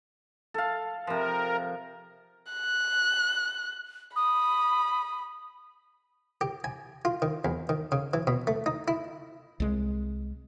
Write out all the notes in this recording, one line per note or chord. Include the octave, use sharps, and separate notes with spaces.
A4 F5
C3 F3 A#4
F#6
B5 D#6
G4
G#5
F4
D#3
E2
D#3
C#3
E3
B2
A3
D#4
E4
C2 G#3